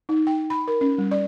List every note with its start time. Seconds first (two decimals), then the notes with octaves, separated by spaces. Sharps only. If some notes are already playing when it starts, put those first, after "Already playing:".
0.09 D#4
0.27 G5
0.50 B5
0.67 A#4
0.81 C#4
0.98 G3
1.11 D5